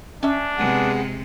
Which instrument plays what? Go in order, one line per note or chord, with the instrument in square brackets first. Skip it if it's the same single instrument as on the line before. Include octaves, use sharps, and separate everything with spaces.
[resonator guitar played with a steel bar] C#4 E5 [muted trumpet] D4
[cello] C3 G#3 [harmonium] B3 G#4 F#5